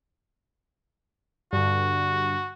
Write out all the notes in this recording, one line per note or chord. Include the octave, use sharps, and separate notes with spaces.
G2 D3 F#4